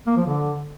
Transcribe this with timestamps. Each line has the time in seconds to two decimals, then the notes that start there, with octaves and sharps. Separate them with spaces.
0.07 A#3
0.17 F3
0.27 D3